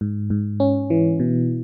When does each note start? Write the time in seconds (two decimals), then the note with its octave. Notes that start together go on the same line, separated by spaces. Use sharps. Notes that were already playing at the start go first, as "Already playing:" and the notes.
0.01 G#2
0.30 G#2
0.60 C#4
0.90 E3
1.20 B2